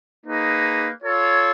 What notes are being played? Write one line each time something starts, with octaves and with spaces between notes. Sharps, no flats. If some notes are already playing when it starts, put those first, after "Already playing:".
A#3 D#4 G#4 B4
F4 A4 C#5